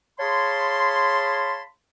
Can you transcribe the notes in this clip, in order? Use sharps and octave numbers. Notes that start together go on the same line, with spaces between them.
G#4 C#5 F5 A5 B5 C6